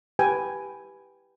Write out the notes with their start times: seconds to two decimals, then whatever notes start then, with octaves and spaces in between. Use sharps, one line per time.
0.19 G4 B4 G5 G#5